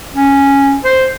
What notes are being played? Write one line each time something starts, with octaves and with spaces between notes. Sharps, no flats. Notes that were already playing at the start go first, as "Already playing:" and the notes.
C#4
C5